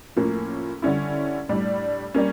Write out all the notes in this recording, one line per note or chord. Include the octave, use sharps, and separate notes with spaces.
A2 F3 A#3 C#4
D3 G3 C#4 E4
A2 G3 D4
G3 A#3 C#4